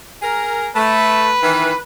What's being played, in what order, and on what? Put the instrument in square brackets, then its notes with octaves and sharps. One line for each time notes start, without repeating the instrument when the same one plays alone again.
[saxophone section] G#4 A#4
[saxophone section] A3 [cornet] B4
[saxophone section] D#3 E3